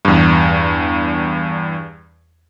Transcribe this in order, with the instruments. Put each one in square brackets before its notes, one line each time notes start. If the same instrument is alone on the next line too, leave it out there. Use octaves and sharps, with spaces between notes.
[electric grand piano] E2 G2